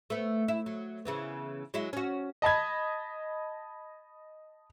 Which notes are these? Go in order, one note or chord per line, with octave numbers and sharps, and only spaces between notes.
A3 B3
E4
F#3
C#3 E3 B3
F#3 G#3 E4
C#4 F#4
D#5 A5 B5 G#6